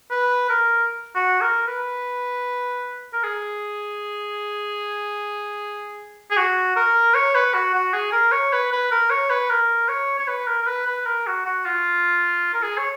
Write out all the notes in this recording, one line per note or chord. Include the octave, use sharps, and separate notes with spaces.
B4
A#4
F#4
A#4
B4
A#4
G#4
G#4
F#4
A#4
C#5
B4
F#4
F#4
G#4
A#4
C#5
B4
B4
A#4
C#5
B4
A#4
C#5
C#5
B4
A#4
A#4
B4
B4
A#4
F#4
F#4
F4
A#4
G#4
C#5